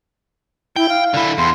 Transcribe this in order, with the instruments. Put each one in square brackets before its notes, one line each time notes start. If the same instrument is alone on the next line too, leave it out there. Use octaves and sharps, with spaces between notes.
[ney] E4 [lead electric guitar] G5
[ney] F5
[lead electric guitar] D3 E4
[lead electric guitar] E2 [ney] C6